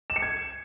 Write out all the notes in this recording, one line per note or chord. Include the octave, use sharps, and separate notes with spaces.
E7
C#7
G#6